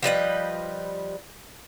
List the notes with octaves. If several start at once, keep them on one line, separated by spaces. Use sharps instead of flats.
F3 G3 B4 D#5